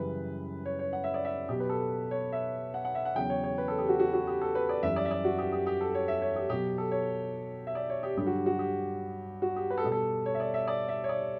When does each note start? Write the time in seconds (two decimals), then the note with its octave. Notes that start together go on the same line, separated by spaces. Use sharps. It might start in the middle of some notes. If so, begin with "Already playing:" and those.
Already playing: F#2 C#3 E3 G3 B4
0.66 C#5
0.79 C#5
0.93 F#5
1.04 E5
1.14 D5
1.25 E5
1.48 B2 F#3 G4
1.60 B4
1.69 A4
2.11 C#5
2.32 E5
2.74 F#5
2.85 F#5
2.95 E5
3.05 F#5
3.15 E2 C#3 F#3 G5
3.30 C#5
3.44 C#5
3.58 B4
3.68 A4
3.78 G4
3.89 F#4
3.99 F#4
4.13 F#4
4.27 G4
4.41 A4
4.55 B4
4.69 D5
4.83 F#2 E3 G3 E5
4.96 D5
5.05 E5
5.11 D5
5.25 F#4
5.38 G4
5.52 G4
5.67 G4
5.81 A4
5.95 C#5
6.08 E5
6.22 C#5
6.36 G4
6.50 B2 F#3 G4
6.78 A4
6.92 C#5
7.67 E5
7.75 D5
7.90 C#5
8.03 G4
8.17 G2 D3 F#3 G4
8.27 F#4
8.46 F#4
8.59 G4
9.42 F#4
9.56 G4
9.70 B4
9.78 A4
9.84 B2 G3 G4
9.92 A4
10.26 C#5
10.35 E5
10.40 D5
10.54 E5
10.68 D5
10.89 E5
11.04 C#5
11.09 D5